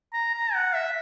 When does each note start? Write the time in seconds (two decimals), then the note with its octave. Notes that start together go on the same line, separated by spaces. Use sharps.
0.14 A#5
0.35 A#5
0.54 F#5
0.75 E5